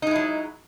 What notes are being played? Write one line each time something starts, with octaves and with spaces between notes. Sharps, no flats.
F#3 G#3 D#4 E4